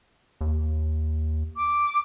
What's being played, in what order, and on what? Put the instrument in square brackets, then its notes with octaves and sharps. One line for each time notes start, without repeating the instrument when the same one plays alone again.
[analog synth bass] D#2
[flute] D6